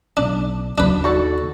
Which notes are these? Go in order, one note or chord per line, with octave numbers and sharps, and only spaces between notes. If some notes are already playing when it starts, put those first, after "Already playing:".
B1 D4
D#2 D3 F#3 D4 B4
D#4 F#4 A4 D5